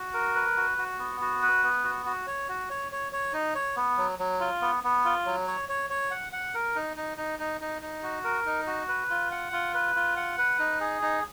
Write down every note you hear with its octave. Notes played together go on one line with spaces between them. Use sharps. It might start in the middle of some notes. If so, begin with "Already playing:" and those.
Already playing: F#4
A#4
B4
F#4
F#4
B3
F#4
B4
B3
F#4
F#4
C#5
F#4
C#5
C#5
C#5
D#4
C#5
B3
F#3
F#3
F4
B3
B3
F4
F#3
C#5
C#5
C#5
F#5
F#5
A#4
D#4
D#4
D#4
D#4
D#4
D#4
F#4
A#4
D#4
F#4
B4
F4
F#5
F4
B4
F4
F#5
B4
D#4
G#4
D#4